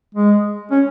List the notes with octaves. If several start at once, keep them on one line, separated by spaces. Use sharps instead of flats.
G#3
C#4